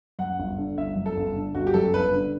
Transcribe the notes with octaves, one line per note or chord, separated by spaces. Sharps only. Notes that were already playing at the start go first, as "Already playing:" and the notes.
F#2 F#5
G1
D3
G1 E5
F#2
A4
G1
D3
G1 F#4
G4
F#2 A4
G1 B4
D3